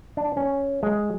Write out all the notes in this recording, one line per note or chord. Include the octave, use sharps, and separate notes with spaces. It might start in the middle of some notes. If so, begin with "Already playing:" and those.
D4
C#4
G#3